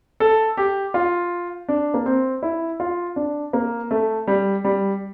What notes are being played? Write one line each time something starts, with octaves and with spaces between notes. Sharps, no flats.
A4
G4
F4
D4
A#3
C4
E4
F4
D4
A#3
A3
G3
G3